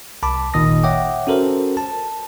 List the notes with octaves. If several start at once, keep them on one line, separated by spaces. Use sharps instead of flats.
C2 A5 B5 D6
G1 A#2 D#3 D#5 D#6 A#6
C#5 E5 F#5 G5 D6
C#4 F#4 A4 A#4 C5
A5